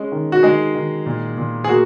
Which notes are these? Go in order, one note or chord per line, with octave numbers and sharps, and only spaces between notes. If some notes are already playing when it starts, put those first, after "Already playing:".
Already playing: G#3 C#4
D#3
F#4
D#3 G#3 G#4
D#3
A#2
A#2
G#4
A#3 F#4